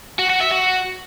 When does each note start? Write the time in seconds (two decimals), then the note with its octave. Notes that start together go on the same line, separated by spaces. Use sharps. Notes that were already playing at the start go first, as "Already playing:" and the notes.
0.19 F#4
0.30 F#4
0.41 E5
0.51 F#4